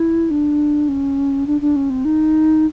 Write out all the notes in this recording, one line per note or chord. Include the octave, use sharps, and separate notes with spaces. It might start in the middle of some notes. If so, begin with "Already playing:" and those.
Already playing: E4
D4
C#4
D4
D4
C#4
C4
D#4